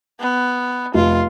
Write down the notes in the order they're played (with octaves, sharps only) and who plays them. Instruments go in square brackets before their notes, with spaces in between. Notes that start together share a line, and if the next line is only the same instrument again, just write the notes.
[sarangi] B3
[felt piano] F1 [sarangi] F4